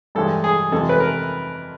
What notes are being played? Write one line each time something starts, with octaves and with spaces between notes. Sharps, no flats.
G2 E3 G#3 A4
G#4
F2 C3 E3 G#3 A4
B4
A#4